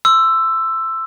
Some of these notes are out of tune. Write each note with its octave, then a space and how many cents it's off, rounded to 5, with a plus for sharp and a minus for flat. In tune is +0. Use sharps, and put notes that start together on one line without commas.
C6 +5 E6 +10